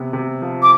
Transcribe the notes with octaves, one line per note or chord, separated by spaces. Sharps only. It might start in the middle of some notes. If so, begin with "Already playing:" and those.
Already playing: C3 B3
C3
F3
D6